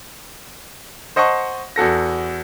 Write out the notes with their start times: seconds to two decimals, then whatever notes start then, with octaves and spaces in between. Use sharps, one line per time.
1.16 C5 D#5 F#5 A5 C#6
1.76 E2 F#4 A4 A#6